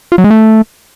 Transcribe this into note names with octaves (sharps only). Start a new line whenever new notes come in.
F4
F#3
G#3
A3